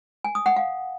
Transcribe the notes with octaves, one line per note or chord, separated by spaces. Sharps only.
G#5
D#6
F#5
F5